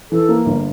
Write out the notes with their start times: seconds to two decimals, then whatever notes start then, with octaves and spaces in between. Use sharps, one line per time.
0.11 E3 A4
0.29 A#3
0.46 G1